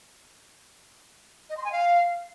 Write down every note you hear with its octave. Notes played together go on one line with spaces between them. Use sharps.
D#5
C6
G#5
F5